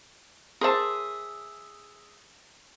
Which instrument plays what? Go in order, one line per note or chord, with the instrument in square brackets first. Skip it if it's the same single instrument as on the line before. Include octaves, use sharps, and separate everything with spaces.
[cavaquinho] G#4 E5 [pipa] A#4 C5 A5